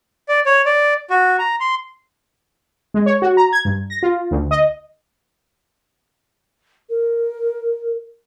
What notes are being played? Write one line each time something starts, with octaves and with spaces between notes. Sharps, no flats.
D5
C#5
D5
F#4
A#5
C6
G#3
C#5
F#4
A#5
G#6
G2
A#6
F4
D2
D#5
A#4